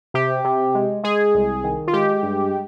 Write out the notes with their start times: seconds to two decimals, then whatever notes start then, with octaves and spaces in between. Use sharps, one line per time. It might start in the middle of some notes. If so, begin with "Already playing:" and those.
0.14 C3 G4
0.45 C3
0.75 G#3
1.04 G#3 G#4
1.34 C2
1.64 D#3
1.88 F4
1.93 G#3 G4
2.23 G2